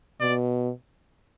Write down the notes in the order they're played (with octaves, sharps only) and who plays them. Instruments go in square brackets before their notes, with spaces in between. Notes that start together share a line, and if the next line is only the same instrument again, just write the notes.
[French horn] B2 [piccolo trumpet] D5